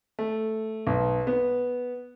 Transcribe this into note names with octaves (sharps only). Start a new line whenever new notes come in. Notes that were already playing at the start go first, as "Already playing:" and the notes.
A3
B1
B3